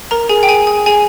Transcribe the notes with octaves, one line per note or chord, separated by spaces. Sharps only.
A#4 A#5
G#4 G#5
G5
G#4 G#5
G#4 G#5
G#4 G#5